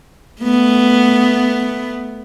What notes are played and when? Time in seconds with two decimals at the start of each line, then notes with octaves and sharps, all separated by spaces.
0.42 A3 B3